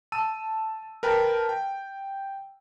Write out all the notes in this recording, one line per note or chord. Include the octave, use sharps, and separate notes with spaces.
A5 E6 D#7
A#4 B4 G5 A5 B5
G5